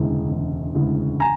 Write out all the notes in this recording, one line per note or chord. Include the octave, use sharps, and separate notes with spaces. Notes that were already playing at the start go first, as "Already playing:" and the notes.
Already playing: E1 D2 C#3 E3 G#3
E1
D2 C#3 E3 G#3
G#5 A#5